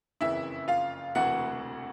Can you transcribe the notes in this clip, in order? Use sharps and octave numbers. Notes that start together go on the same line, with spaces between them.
F#1 F2 C#3 E3 E4 E5
F4 F5
E1 D2 C3 E3 A3 F#4 F#5